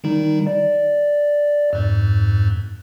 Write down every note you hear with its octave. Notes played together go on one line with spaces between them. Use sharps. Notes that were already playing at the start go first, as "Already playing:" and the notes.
D#3 G3 D#4
D5
F2 G#2